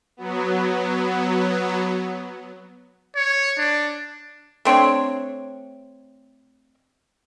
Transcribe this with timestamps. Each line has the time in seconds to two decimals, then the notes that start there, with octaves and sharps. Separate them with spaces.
0.17 F#3 B3
3.16 C#5
3.58 D4
4.65 A3 C4 D4 C#5